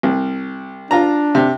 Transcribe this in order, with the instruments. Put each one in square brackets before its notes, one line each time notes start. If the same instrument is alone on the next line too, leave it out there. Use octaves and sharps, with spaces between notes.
[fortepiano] C2
[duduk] D4 [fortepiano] F4 A#5
[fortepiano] C3